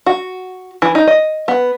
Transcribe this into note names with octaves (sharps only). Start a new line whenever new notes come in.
F#4
E3
D#4
D#5
B3